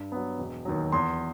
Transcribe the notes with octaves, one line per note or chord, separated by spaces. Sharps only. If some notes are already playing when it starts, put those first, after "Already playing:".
Already playing: G2
F#3 B3
E1
D#2 D#3 F#3
E2 C6